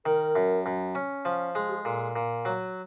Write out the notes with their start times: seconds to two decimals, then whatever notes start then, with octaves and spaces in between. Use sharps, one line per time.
0.05 D#3 A#4
0.36 F#2
0.66 F#2
0.95 C#4
1.25 F3
1.55 G#3
1.68 G4
1.77 G#4
1.85 A#2 A4
2.16 A#2
2.45 F#3